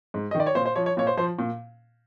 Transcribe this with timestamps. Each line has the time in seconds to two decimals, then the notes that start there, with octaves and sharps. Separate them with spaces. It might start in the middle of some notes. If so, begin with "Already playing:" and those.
0.14 G#2
0.31 D#5
0.35 D#3
0.40 D5
0.47 C#5
0.55 A#2 C5
0.66 C5
0.76 F3 C#5
0.86 C#5
0.97 A#2 C#5
1.07 C5
1.17 F3 C5
1.39 A#2